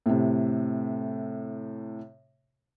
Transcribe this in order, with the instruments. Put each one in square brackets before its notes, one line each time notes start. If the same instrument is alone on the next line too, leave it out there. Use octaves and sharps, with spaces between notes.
[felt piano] A2 C3